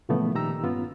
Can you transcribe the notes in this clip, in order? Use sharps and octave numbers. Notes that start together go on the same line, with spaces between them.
A#2 C#3 E3 F3 A3 B3
A#2 D#3 D#4 G4 A#5 E6
G2 B3 C#4 F4